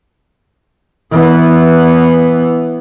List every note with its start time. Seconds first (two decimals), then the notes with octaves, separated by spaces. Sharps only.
1.11 E3 B3